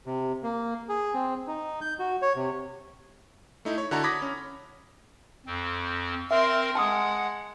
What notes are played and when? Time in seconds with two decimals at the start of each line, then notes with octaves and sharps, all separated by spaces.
0.06 C3
0.43 A#3
0.89 G#4
1.14 C4
1.47 D#4
1.81 G6
1.99 F#4
2.22 C#5
2.36 C3
3.65 A3 D#4 E4
3.78 C#5
3.91 D3 E4 F#4 A4 A#5
4.04 B5 D6 D#6 G#6 A#6 B6
4.22 C#4
5.46 F2 C4
6.31 C4 A#4 E5 C6
6.75 G#3 F#5 A5 C6 D#6